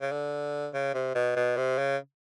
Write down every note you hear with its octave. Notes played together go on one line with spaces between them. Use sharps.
C#3
D3
C#3
C3
B2
B2
C3
C#3